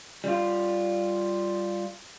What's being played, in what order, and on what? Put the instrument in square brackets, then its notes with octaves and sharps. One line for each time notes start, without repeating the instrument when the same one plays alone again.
[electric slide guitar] G3 F4